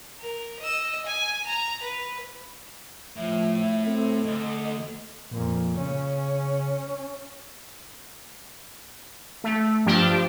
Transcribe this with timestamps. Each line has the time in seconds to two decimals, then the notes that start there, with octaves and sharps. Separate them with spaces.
0.20 A#4
0.59 D#5 E6
1.05 G#5
1.46 A#5
1.82 B4
3.17 A2 F3 E5
3.86 C4 A4
4.25 D2 D#5
5.31 F2 A#2
5.77 C#3 C#4
9.44 A3
9.86 G2 F3 D4 G4